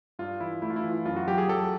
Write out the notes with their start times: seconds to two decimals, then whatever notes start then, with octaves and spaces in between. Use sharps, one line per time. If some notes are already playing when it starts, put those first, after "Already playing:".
0.19 G2 F4
0.40 E3 E4
0.62 A3 E4
0.70 F4
0.76 E4
0.84 E3
0.91 F4
1.05 F#2 F4
1.16 F#4
1.27 F#3 G4
1.38 G#4
1.48 F#3 A4